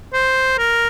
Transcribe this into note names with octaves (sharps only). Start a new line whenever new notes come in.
C5
A#4